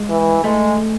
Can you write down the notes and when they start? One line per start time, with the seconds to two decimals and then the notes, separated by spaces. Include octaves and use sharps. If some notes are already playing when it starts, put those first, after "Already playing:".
Already playing: G#3
0.10 E3
0.44 G#3 A3